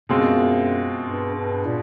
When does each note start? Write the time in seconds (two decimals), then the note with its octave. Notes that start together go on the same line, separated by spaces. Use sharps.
0.09 F#2 B2 G#3 C4 F4
1.04 G2
1.34 G2
1.66 A#2